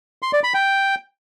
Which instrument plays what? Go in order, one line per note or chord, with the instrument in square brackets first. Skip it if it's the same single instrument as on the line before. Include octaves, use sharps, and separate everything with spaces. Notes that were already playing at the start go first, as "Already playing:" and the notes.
[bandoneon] C6
D5
B5
G5